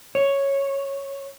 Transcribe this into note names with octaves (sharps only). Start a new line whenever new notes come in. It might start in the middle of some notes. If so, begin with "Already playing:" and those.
C#5